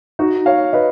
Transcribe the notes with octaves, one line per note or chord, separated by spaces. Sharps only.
D#4 F#4
C#5 F5
B4 D#5